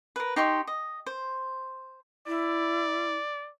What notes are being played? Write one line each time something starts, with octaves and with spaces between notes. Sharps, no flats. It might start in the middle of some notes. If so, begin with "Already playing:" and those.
A#4 B4
D#4 G4 C6 C#6
D#5
C5
E4 D5